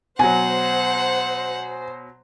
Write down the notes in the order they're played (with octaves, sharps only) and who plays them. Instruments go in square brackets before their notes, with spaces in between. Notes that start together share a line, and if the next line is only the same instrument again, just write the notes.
[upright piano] B2 F#3 [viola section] C5 [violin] F#5 [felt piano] G#5